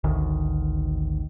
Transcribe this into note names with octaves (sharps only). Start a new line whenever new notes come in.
G#1 D2 D#3